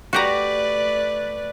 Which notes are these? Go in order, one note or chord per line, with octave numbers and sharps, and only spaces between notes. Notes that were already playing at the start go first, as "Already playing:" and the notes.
A3 F#4 G4 B4 D5 A#5